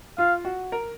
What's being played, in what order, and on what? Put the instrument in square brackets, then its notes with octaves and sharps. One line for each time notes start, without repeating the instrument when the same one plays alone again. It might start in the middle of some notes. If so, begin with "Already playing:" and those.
[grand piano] F4 [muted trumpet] F5
[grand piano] F#4
A#4